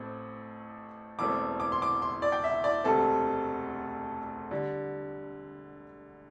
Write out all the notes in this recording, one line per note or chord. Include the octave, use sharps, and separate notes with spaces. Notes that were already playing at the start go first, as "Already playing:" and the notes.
Already playing: A1 A2 A3 C4
E1 E2 E3 A3 C4 D6
D6
C6
D6
C6
D5
G5
E5
D5
E1 D2 C3 A3 C4 A4
D3 G3